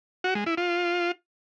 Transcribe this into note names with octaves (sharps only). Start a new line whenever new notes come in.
F#4
G#3
E4
F4